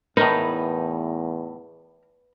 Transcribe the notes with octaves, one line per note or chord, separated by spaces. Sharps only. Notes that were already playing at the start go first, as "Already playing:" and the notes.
E2 A2 D#4 A#4 B4 D#5 A#5